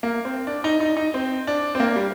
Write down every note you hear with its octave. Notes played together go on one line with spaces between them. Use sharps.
A#3
C4
D4
D#4
D#4
D#4
C4
D4
C4
A#3
G3